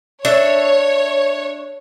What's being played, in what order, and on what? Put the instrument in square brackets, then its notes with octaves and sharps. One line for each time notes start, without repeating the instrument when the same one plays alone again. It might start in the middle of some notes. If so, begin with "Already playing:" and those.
[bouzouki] D4 E5 [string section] C#5